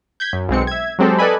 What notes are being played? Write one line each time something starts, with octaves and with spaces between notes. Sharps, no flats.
G6 G#6 B6
F#2
B1 G#3 C4 C#7
E5 G#6
F#3 G#3 C4 G4 A4
A4 B4 D5 D#5 G#5 B5